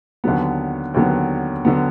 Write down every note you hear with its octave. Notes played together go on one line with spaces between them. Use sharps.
D#2 D3 F#3 B3
D#2 D3 F#3 B3
D3 F#3 B3